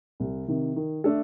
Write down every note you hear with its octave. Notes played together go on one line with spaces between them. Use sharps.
C2
C3 D#3
D#3
A3 D4 A4